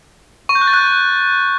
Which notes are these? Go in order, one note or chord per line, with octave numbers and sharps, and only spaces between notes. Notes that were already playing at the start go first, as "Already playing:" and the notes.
C#6
G6
F#6
A6
F#6